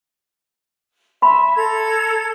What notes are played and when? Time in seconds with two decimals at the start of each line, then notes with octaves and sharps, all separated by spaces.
1.22 E5 B5 C6
1.55 A4 A#5 G#6